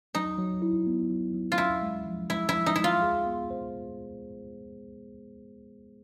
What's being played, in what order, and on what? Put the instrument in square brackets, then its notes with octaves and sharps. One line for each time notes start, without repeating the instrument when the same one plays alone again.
[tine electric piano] F#3 [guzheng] D#4
[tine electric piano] F#3
E4
B3
F#3
F#3
[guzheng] F4
[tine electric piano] C#4 [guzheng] E4
[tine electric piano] G#3
F3
[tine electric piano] G#3 [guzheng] E4
[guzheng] E4
[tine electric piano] F3
[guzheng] D#4
[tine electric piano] G#3 [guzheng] E4
[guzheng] F4
[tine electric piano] G#4
B3
C5